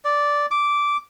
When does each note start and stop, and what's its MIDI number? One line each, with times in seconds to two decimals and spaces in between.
0.05 0.46 74
0.51 0.97 86